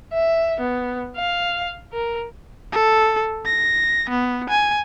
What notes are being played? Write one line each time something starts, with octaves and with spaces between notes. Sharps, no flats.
E5
B3
F5
A#4
A4
A#6
B3
G#5